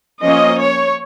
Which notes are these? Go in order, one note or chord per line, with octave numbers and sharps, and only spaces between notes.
F3 A#3 C#4 D#5
C#5